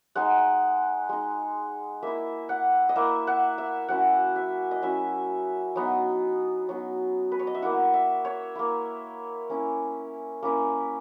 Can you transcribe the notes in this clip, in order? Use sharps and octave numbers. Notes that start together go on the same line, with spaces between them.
G#3 D#4 F#5
G#3 D#4
A#3 E4 E5
F#5
D#5
A#3 E4 E5
F#5
E5
F#3 C#4 E4 F#5
E5
D#5
F#3 C#4 E4 E5
F#3 B3 D#4
F#3 B3 D#4
B4
C#5
D#5
E5
A#3 E4 F#5
E5
C#5
A#3 E4
A#3 C#4 E4
A#3 C#4 E4